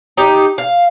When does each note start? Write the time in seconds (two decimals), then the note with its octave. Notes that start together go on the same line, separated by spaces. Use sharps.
0.17 D#4 G4
0.58 F5